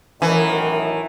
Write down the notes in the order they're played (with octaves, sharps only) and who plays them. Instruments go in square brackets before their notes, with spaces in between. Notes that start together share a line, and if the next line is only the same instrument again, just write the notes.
[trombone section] F#2 A2 D#3 [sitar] E3 [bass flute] A#4